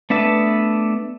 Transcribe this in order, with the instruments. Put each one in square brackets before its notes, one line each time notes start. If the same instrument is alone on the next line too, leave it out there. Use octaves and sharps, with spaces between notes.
[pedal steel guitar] A3 B3 D4 E5 A5